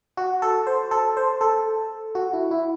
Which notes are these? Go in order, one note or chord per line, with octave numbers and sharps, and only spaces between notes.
F#4
A4
C5
A4
C5
A4
F#4
E4
E4